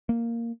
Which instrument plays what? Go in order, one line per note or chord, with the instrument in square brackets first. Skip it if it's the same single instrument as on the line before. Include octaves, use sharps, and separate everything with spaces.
[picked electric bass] A#3